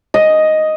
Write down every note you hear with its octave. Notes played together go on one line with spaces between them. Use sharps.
D#5